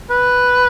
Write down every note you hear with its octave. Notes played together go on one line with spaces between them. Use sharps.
B4